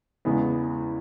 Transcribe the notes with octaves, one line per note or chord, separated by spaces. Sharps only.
E2 C#3 E3 G#3 B3